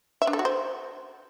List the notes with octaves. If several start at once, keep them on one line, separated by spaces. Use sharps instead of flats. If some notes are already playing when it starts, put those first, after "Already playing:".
E5
D4
A4
F#4
C5